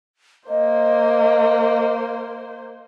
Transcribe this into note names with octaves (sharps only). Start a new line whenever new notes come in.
A#3 C5 D#5